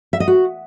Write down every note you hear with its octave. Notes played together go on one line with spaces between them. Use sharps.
E5
D#5
F#4